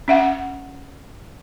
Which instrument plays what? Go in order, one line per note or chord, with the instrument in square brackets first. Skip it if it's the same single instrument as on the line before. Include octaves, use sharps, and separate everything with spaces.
[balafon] C#4 E5 F#5